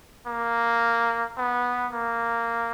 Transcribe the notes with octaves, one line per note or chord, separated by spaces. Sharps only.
A#3
B3
A#3